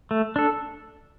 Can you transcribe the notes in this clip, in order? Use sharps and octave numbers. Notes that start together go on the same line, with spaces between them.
A3
D4 A4